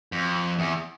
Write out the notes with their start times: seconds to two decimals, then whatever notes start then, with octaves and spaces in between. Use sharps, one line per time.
0.12 F2
0.59 E2